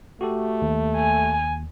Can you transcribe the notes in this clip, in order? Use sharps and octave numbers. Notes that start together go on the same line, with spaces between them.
A3 F#4 G4 A4
D#2
G#5